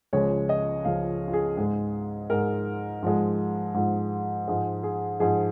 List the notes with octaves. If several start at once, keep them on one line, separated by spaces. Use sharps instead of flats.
C#2 C#3 F3 G#3 C#5
D#5
C#2 C#3 F3 G#3 F5
F4
G#4
G#2 G#3
G#2 G#3 A#4
G#2 F3 G#3
G#2 F3 G#3
G#2 F3 G#3
G#4
G#2 F3 G#3 G#4